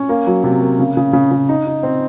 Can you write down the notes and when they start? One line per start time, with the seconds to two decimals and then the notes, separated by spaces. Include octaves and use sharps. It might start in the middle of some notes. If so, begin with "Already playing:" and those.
Already playing: C#4
0.09 A#3
0.27 F#3
0.44 C3
0.61 A#3
0.79 C#3
0.97 C#3
1.13 C#3
1.31 C#3
1.49 D#4
1.67 D#4
1.83 C4